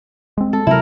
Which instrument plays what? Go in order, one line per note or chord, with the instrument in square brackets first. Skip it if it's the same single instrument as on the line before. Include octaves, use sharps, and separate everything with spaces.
[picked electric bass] G#3 C4
[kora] A4
[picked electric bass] C3 F#3 [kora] E4 A#4